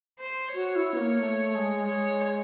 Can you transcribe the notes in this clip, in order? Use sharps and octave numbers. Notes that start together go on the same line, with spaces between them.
C5
F#4 C#5
E4
B3
A#3
A3
G#3
G#3 C#5